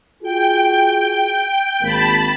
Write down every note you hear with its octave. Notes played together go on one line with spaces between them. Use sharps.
F4 F#4 G#4 G5
G#1 A#3 A5 B5